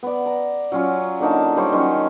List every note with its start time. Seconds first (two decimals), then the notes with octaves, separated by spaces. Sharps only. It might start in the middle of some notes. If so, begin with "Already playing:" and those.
0.03 B3 D5
0.26 A#5
0.72 F#3 C#4 F4
1.20 D3 A#3 D#4 A5
1.57 G3 C5 C#5
1.72 D#3 F#3 C#4 C5